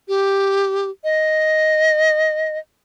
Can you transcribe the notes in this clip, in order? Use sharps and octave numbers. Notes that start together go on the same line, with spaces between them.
G4
D#5